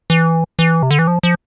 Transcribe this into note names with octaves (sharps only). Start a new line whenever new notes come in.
E3
E3
C3
D3
E3
F3
F3